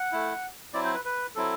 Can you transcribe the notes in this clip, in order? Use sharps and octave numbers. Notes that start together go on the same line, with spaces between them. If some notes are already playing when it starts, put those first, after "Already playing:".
Already playing: F#5
A3 E4
F#3 C4 E4 D5
C5
B4
B4
F#3 C4 E4 A4